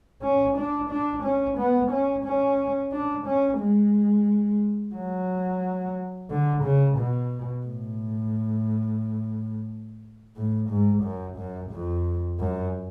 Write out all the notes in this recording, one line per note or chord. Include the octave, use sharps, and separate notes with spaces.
C#4
D4
D4
C#4
B3
C#4
C#4
D4
C#4
G#3
F#3
D3
C#3
B2
A2
A2
G#2
F#2
F#2
F2
F#2